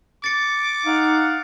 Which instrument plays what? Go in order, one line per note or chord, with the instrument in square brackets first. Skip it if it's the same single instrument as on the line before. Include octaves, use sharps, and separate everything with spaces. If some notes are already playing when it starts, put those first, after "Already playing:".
[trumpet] D6 [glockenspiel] A6 C#7
[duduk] D#4 [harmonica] F5 F#5